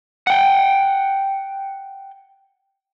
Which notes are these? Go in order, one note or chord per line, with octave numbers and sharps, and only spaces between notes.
F#5 G5